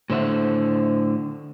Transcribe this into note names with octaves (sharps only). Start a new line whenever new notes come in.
A2 D3 C5 E5 F#5